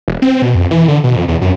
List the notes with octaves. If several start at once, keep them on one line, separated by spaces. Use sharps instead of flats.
E1
C4
B2
F2
E3
D3
B2
F2
E2
F#2